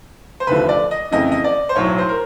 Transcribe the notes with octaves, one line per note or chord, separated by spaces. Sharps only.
C5
F1 D#2 D3 F3 A3 B4
D5
D#5
F2 C#3 E3 A3 D#5
D#5
D5
C5
B1 A2 F#3 C#5
C5
A#4